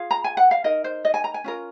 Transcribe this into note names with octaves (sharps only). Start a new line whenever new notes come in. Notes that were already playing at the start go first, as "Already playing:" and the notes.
Already playing: F4 G#4 F5
A#5
G#5
F#5
F5
D#4 A#4 D#5
C5
D#5
G#5
A#5
G#5
C#4 F4 A#4